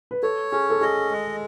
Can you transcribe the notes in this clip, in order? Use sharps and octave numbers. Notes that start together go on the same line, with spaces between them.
B4
A4 C#5
C#4 G#4
A4
G#4 D#5
G#3